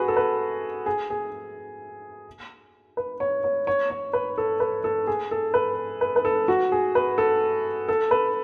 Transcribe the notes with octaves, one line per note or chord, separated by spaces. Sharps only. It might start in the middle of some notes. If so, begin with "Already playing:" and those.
Already playing: F#4 G#4 B4
A4
B4
G#4
G#4
B4
C#5
C#5
C#5
C#5
B4
A4
B4
A4
G#4
A4
B4
B4
B4
A4
F#4
G#4
B4
A4
A4
B4